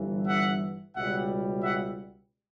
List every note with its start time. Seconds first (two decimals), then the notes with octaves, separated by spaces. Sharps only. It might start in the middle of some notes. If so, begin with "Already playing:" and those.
Already playing: G1 G2 E3 G3
0.27 E5 F#5
0.95 C#2 B2 G3 E5 F#5
1.63 E5 F#5